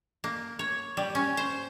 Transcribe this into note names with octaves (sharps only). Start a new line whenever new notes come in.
A#3
C#5
G3
C#4
C5